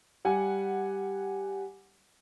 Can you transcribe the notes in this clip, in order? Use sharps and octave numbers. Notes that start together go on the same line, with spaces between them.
G3 F#5 G#5